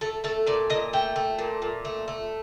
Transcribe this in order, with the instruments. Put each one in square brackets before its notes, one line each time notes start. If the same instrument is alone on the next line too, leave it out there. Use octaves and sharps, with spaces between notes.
[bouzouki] A3 A4
A3 A4
A#2 D5
A#2 D#5
A3 G5
A3
A#2
A#2
A3
A3